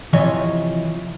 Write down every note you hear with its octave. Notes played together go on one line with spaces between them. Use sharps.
C3 E3 F3 C#5 D#5